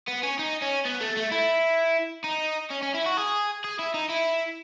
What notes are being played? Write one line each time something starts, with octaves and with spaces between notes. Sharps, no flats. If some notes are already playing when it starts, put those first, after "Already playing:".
B3
C#4
D#4
C#4
B3
A3
A3
E4
D#4
C#4
C#4
E4
F#4
G#4
G#4
E4
D#4
E4